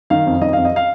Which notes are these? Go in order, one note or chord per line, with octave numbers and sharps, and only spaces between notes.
D#3 F5
F2
D#3 D#5
F2 F5
D#5
F5